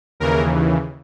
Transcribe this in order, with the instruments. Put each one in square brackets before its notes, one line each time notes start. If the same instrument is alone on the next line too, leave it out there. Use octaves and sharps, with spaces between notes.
[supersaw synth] D#2 C#3 E3 A#4